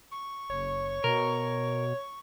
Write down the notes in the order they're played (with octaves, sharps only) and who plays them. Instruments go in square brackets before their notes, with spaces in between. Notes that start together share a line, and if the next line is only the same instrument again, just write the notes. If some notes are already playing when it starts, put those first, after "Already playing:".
[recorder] C#6
[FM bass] F#1 [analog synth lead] C#5
[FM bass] B2 [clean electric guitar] A#4